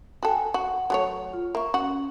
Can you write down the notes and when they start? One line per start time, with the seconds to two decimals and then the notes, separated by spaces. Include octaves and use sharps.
0.23 F#4 A4 G5 G#5
0.54 F#4 F#5
0.90 F#3 A3 C#5
1.33 F4
1.55 A#3 E5 C#6
1.74 C#4 F#4